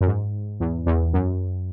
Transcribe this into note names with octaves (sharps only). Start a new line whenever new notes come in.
F#2
G#2
E2
E2
F#2